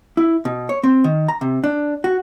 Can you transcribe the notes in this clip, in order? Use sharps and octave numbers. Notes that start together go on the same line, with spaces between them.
E4
B2
C#5
C4
D#3
A#5
C3
D4
F#4